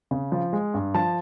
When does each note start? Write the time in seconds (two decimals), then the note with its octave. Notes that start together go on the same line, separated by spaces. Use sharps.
0.11 C#3
0.32 F3
0.53 G#3
0.74 G2
0.94 F3 A5